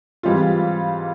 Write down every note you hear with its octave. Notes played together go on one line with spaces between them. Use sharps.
G#2 E3 G3 C4 F4